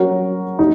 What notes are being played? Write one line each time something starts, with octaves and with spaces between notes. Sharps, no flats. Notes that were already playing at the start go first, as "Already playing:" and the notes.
Already playing: F#3 C#4 F#4 A#4
D#4